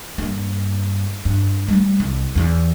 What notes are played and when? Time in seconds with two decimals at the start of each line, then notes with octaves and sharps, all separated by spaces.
0.18 G2 A#3
1.25 G2
1.68 G3 A3
2.00 C2
2.35 E2 E3